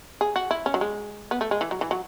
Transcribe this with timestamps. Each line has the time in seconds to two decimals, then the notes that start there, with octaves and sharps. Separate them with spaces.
0.21 G#4
0.36 F#4
0.51 E4
0.66 C#4
0.74 F#3
0.81 G#3
1.31 B3
1.41 A3
1.51 G#3
1.61 E3
1.71 F#3
1.81 E3
1.91 F#3